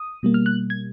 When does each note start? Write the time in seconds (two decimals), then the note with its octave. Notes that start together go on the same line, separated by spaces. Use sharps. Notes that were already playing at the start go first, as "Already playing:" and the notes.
Already playing: D#6
0.23 B2 G3 A#3
0.34 F6
0.46 F#6
0.70 G#6